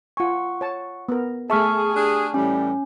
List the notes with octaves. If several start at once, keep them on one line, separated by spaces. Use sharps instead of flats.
F4 F#5 G#5 C#6
C#5 A5
B3 A#4
A3 G#4 E5 A5 C#6 F6
D4 G4 G#4
A2 E3 G3 C#4